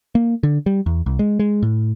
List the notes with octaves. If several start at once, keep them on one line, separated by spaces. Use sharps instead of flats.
A#3
D3
G3
E2
C2
G#3
G#3
A2